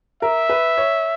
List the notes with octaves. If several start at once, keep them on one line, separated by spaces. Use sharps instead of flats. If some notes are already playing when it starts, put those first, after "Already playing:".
A#4 E5
B4
C#5